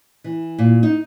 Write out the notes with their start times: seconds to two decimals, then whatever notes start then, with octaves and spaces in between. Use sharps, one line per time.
0.24 E3
0.58 A#2
0.83 D#4